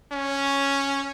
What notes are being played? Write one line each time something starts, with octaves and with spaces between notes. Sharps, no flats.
C#4